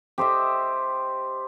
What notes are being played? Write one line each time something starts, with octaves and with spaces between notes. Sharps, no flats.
G4 C5 D#5 E5